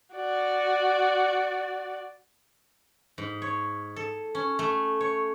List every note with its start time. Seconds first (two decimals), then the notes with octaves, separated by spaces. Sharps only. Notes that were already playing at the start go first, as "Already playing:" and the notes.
0.15 F#4 D5
3.18 G#2
3.42 C#5
3.96 A4
4.35 C#4
4.59 A3
5.01 C#5